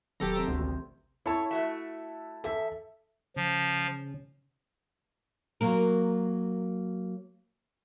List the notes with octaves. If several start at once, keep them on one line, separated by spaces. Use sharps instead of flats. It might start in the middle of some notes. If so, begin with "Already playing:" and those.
D#1 D#3 F#3 B3 G4 A4 A#5
C3 C4
G1 D2
A1
E4 A4 C#5 A5
A3 F#4 E5
E2 A4 E5
C#3 F3
F#3 A#3 A#4